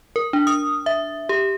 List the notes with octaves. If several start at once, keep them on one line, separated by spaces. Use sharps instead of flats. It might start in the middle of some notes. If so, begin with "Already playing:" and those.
A#4
D4
D#6
E5
G4